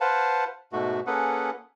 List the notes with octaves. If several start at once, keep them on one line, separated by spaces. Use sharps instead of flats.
B4 C5 F5 F#5 A5
G#2 B2 A3 F#4
A#3 C#4 G#4 A4 B4 F#5